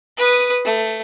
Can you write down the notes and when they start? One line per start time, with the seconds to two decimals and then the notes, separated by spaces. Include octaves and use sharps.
0.17 B4 D#6
0.64 A3